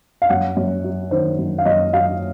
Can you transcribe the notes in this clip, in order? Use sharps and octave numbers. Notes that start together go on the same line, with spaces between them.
F5
F#2 F#5
F#2
F#3
D#3 C5
F#2
F5
F#2 D#5
F#3 F5